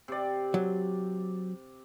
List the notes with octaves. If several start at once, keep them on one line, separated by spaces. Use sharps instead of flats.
C3 D5
F#3